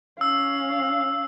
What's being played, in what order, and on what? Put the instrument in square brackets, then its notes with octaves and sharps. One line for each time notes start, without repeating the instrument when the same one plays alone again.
[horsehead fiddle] C#4 F5 [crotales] E6